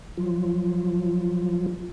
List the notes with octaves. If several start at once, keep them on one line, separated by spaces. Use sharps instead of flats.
F3 F#3 F4